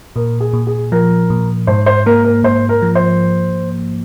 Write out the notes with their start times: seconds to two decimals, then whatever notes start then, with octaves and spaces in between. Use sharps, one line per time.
0.16 A#2 A#4
0.40 G#4
0.53 A#2
0.67 G#4
0.92 F3 A#4
1.30 A#2
1.67 G#2 C5
1.86 C5
2.06 A#3 A#4
2.24 A#4
2.44 G#2 C5
2.69 A#4
2.82 F3
2.95 C5